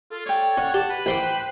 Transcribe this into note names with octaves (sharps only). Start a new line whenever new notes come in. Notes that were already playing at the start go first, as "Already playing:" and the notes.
F4 A4
C#5 D5 G5
C#4 F#5
G4 A5
B4
A1 C5 G5 C6 D6